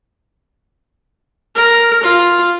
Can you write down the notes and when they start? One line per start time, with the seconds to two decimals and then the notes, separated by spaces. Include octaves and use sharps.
1.55 A#4
2.03 F4